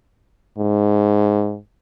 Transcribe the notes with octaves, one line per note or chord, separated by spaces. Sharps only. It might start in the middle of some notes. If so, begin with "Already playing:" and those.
G#2